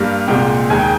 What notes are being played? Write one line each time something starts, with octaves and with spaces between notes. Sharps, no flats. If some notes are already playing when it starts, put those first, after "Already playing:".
Already playing: G2 G3 A#3
C2 A#2 G#3 G5
D#2 D#3 G#3 G#5
G5